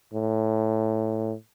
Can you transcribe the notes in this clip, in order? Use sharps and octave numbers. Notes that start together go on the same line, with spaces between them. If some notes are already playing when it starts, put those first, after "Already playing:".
A2